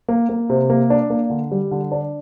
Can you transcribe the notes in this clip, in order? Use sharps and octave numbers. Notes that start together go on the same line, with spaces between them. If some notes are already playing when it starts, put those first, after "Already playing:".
A#3
A#3
C3
A#3
D4
A#3
D3
G3
D3
D4